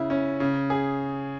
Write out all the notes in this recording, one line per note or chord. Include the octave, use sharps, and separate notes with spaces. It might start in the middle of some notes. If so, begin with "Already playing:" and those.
Already playing: C#3 E4
C#4
C#3
G#4